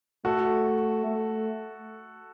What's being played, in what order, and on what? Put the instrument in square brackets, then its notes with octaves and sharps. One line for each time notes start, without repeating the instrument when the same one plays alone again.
[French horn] A3 [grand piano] F#4 A4
[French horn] A3